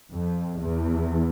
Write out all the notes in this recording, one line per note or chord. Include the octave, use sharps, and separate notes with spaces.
F2
E2